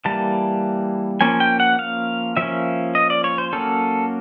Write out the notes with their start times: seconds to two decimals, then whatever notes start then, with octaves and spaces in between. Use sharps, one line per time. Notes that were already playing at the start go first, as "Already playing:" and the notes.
0.05 E3 G3 A#3 A5
1.21 F3 A#3 C#4 G#5
1.40 G5
1.60 F#5
1.79 F5
2.37 F3 A#3 C#4 E5
2.95 D#5
3.10 D5
3.24 C#5
3.38 C5
3.53 F#3 A#3 C#4 A4